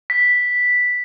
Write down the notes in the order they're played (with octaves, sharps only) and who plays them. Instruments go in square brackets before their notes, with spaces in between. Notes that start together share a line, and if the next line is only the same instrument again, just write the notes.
[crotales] B6